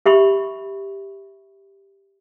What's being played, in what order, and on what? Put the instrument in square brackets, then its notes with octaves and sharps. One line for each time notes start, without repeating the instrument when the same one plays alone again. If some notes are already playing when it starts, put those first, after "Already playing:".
[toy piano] G4 E5 B5 C#6